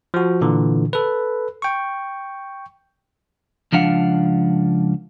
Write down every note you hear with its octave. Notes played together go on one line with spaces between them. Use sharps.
F3 F#4
A#2 D3 E3
A4 B4
G5 C#6
C#2 F3 D4 F5 F#5